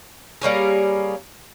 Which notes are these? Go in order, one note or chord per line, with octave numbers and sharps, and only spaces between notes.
G3 A#3 C#4 G#4